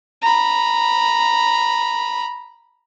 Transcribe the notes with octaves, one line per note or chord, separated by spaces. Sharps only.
A#5 B5